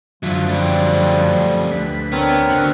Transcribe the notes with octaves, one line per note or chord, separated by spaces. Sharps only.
F#2 D3 F3 F#3 F4 E5
G3 A3 G4
D2 B4
B3 C4 D4 A#4 C#5
D3 F#4